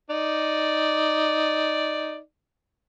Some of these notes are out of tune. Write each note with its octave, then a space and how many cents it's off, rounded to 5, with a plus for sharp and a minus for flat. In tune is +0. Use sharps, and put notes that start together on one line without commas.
D#4 +0 D5 +0